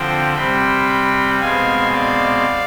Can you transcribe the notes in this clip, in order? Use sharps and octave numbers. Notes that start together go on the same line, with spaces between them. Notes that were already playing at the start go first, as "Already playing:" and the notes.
Already playing: D3 F3 C4 G5
C3 G3 C4 G5 B5
B2 G#3 C4 F5 G#5
D5 F5